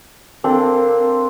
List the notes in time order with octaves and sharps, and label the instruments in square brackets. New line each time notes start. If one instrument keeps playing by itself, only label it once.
[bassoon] A#3 [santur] C4 D4 A4